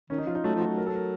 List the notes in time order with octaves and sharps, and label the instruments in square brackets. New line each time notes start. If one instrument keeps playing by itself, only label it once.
[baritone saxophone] D#3 [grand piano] C#4
[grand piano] D#4
[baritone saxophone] F3 [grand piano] F4
[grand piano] D#4
[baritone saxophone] F#3 [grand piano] A3
[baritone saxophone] F3
[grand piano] F#4
[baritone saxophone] F#3
[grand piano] A#4
A4
A#4